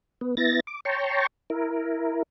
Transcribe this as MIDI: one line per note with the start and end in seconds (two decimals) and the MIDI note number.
0.21 0.35 59
0.37 0.60 59
0.37 0.60 64
0.37 0.60 93
0.37 0.60 94
0.67 0.80 86
0.85 1.27 73
0.85 1.27 79
0.85 1.27 81
0.85 1.27 82
0.85 1.27 84
0.85 1.27 85
1.50 2.23 64
1.50 2.23 70